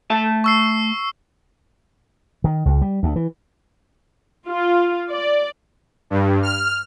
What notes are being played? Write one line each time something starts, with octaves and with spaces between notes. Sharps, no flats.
A3 E5 A5
C#6 E6 C7
D#3
C#2
G3
D2
E3
F4
D5
G2
F6